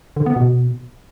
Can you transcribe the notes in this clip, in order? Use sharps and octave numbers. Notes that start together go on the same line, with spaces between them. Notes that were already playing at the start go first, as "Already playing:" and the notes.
D3
B3
B2